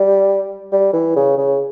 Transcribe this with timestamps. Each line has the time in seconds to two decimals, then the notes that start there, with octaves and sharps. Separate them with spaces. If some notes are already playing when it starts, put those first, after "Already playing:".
Already playing: G3
0.72 G3
0.93 E3
1.16 C#3
1.38 C#3